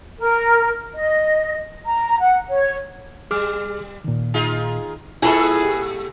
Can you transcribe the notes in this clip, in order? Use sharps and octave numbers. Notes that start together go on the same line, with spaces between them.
A#4
D#5
A#5
F#5
C#5
G3 G#4 D6 F6
A#2 D#3
D#4 F4 G#4
A#2 G#3 E4 F4 G#4 A4 B4
G4